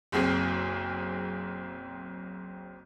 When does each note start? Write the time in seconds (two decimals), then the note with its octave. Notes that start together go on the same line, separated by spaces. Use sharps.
0.12 F#1 B1 C4 G#4 C7